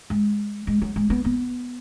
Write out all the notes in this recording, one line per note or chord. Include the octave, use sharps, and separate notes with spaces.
G#3
G#3
F#3
G#3
B3
B3